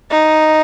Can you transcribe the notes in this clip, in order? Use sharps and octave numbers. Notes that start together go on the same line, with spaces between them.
D#4